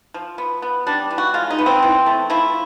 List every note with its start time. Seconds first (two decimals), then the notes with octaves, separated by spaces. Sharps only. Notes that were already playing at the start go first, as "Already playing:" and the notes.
0.14 F3
0.38 B3
0.62 B3
0.87 G3 D4
1.10 E3
1.18 F#4
1.34 G#3 F4
1.50 D#4
1.59 B3
1.66 C4
1.83 E3
2.06 A3
2.30 F3 E4